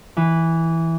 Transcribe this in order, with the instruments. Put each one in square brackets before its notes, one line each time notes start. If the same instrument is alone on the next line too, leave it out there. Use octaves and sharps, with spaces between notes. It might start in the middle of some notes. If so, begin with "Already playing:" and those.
[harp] E3